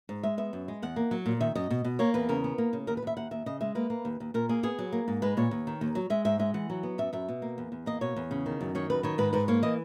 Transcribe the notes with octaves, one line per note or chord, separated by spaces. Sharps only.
G#2
G#3 E5
B3 E5
F#2
G#3
E2 F#5
A#3
F#3
A#2
D#3 E5
F#2 D#5
B2
B2
A#3 C#5
E2 B4
C#3 A#4
B3
A#3
C#3
D#2 A#4
B4
D#2 E5
D#2 F#5
D#2 E5
C#3 D#5
G#3 E5
A#3 B4
A#3
D#2
D#2
A#2 A#4
A#3 G#4
B3 G#4
F#3
A#3
G#2
G#3 B4
A#2 C#5
D#2
D#3
D#2
F#3
G#3 E5
G#2 E5
G#3 E5
E3 F#5
F#3
B3
F#2 E5
F#2 E5
B2
A#3
E2
E2
A#3 D#5
B2 C#5
E2
C#3
D#3
F#2
D#3 C#5
F#2 B4
D#3 C#5
G#2 B4
G#2 B4
A#3 C#5
E3 D#5